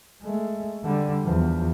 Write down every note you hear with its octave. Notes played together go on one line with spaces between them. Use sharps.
G#3 A3
D3 G3
E2 F3